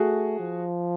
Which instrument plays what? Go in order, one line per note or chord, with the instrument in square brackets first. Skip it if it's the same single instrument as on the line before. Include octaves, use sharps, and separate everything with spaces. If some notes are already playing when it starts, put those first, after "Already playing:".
Already playing: [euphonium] A3 [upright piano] F#4 G#4
[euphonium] F3